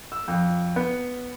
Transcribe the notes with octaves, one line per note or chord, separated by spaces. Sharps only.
E6
F2
B3